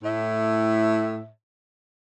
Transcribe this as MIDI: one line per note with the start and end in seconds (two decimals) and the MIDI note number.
0.04 1.28 45
0.04 1.28 76